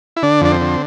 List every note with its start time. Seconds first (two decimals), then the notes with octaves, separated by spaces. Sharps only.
0.17 E4
0.22 D3 D4
0.41 F2 D4
0.52 C4
0.61 D3